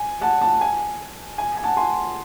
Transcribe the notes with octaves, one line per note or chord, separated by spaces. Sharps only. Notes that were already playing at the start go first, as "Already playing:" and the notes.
Already playing: G#5
F#5 A5
F#5 A5
G#5
G#5
G#5
F#5 A5
G#5 C6